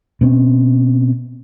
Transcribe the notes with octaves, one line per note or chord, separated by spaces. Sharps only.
B2 C4 C#4